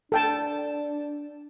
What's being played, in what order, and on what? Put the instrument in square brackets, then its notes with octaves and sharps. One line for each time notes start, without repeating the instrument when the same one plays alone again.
[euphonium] D4 [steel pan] A4 G5 A5